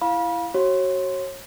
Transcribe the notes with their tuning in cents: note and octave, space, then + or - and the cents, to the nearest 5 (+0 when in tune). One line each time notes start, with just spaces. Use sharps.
E4 +20 F5 +10 B5 -35
F#4 +25 C#5 -30